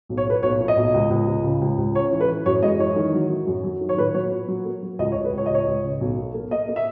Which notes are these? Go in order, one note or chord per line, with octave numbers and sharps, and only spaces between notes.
B1
C#5
A#2 B4
B1 C#5
A#2
D#5
B1
C#2
C#2
C#2
C#3
C#2
C#2
C#4 C#5
E3
B4
E3
F#2 C#5
G#3 D#5
E3 C#5
D#3
F#3
F#3
F#2
F#3
D#3
C#5
A#2 B4
F#3 C#5
A#2
F#3
A#3
F#3
C#2 D#5
C#5
C#2
B4
C#2 C#5
D#5
C#2 C#5
C#2
C#3
B1
A#3
A#3
A#3 D#5
A#3
E5